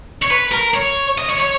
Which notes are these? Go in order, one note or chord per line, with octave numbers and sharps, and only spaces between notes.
C#5
B4
A#4
C#5
D#5
C#5
C#5